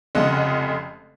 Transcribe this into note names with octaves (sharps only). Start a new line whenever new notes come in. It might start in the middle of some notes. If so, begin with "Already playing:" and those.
F1 F2 C#3 G#3 D#5 F#5